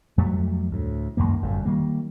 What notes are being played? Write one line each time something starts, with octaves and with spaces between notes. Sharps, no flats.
F2 F#3 G3 A3
D2 A2
C#2 F#2 D#3 A#3
G1 F#2 A2
D#3 G3 A#3